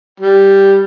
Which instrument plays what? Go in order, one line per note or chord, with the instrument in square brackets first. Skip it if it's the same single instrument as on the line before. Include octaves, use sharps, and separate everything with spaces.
[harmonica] G3